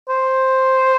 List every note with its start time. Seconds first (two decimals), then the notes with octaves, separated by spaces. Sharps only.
0.09 C5